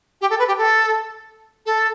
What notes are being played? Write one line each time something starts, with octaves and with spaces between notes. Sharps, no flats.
G4
A4
B4
G4
A4
A4